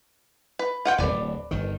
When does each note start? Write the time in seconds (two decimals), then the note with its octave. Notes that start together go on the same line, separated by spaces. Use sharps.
0.59 B4
0.85 F4 F#5 G5
0.98 D1 G1 B4 D5
1.51 G1 D#3